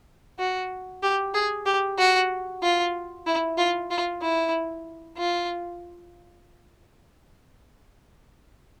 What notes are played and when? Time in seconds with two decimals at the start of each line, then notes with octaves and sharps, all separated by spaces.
0.39 F#4
1.03 G4
1.34 G#4
1.66 G4
1.98 F#4
2.63 F4
3.26 E4
3.58 F4
3.91 F4
4.22 E4
5.18 F4